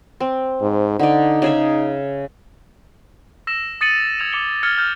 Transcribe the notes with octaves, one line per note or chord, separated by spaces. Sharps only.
C4
G#2
D3 D#4 D5
C#3 G#4 E5
E6 A#6 E7
D#6 A6 C#7 D#7 F#7
E6 G#6 D#7 F7
D6 C#7 G7
E6 F6 G#6 A6 C#7 G7
F6 G6